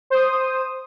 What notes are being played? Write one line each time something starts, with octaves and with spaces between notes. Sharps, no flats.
C5 D#6